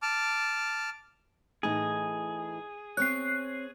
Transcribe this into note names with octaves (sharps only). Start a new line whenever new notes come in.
A5 D6 F6
A2 E3 D#4 G#4
C4 C#5 F#6 C7